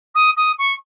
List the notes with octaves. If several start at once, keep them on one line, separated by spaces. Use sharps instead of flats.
D#6
D#6
C#6